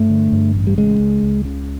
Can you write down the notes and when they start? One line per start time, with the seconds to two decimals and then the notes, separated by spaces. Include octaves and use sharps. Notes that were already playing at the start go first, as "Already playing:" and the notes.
Already playing: G2 A3
0.10 D3
0.32 G2
0.55 A1
0.67 G3
0.78 C#3 G#3
1.00 C#2
1.23 C#2
1.45 C#3